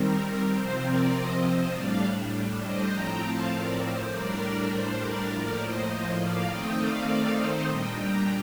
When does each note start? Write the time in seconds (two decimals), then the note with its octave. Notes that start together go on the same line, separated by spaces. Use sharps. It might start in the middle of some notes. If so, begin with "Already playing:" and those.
Already playing: D#3 G3 C4 A#4
0.53 C3 F3 C4 C5
0.83 A#4 D5
1.13 C5 D#5
1.42 C5 D#5
1.72 A2 G3 D4 D5 F5
2.61 C5 D#5
2.91 A2 F3 C4 G5 A#5
3.21 F5 A5
3.51 A#4 D5
3.81 C5
4.10 A2 G3 D4 A#4 D5
4.70 C5
5.00 A#4 D5
5.29 A2 F3 A#3
5.59 C5 D#5
6.18 D5 F5
6.48 D#3 A3 C4 D#4 D#5 G5
6.77 D5 F5
7.37 C5 D#5
7.67 A#2 G3 D4 D#5 G5
7.97 G5 A#5